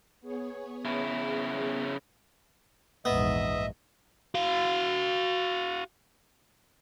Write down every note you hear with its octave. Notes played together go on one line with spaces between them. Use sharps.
B3 G#4 C#5
C#3 E4
A#1 E2 G#2 B3 D#5 E5
F#4 F5